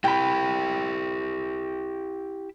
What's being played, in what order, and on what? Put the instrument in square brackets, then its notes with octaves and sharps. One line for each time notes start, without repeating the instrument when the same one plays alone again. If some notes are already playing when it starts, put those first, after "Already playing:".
[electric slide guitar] E4 G4 [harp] G5 B5